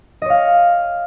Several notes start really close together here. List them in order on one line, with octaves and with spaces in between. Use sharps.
D#5 C#5 F5